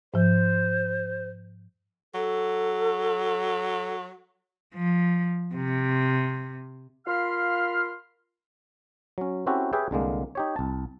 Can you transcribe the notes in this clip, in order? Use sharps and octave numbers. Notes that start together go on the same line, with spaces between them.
G#2 F3 C5
F#3 A4
F3
C3
F4 A#4 F5 B5 C6 F6
F#3 C#4
C4 C#4 E4 F#4 G4 A4
G4 G#4 B4 C#5 E5 G5
C2 D3 G#3 A#3
D#4 G4 C#5
C2 A5